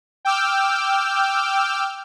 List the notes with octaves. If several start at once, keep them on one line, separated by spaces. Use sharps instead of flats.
G5 D6 E6 F6 G6